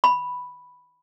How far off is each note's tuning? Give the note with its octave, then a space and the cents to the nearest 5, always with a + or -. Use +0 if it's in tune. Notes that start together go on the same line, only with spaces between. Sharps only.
B5 +0